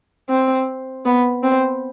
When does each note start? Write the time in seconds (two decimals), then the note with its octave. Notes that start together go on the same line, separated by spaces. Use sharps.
0.29 C4
1.05 B3
1.43 C4